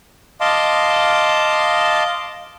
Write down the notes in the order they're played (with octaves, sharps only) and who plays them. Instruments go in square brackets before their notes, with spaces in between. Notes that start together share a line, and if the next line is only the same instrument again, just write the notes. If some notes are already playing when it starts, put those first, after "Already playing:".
[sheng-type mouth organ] D#5 F5 A5 C6 D6